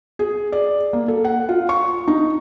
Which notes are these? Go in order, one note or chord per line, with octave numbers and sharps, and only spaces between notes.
G#4
D5
A#3
A4
F#5
F4
C#6
D#4